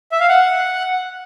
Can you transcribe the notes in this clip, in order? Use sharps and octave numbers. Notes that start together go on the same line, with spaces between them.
E5
F5
F#5